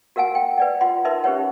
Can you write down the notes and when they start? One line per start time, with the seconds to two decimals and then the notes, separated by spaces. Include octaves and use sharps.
0.16 F#4 A#4 F5 F#5 G#5
0.35 G5
0.58 B4 D5 F#5
0.81 F4 F#5 C6
1.05 D#4 A#4 B4 E5 C6
1.24 C#4 G4 B4 C#5 F#5